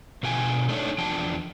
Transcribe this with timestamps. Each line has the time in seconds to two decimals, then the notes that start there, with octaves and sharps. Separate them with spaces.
0.23 B2 D3 F4 G5 G#5
0.69 A3 D4 D#4 C#5
0.98 E2 F3 D4 G5 A5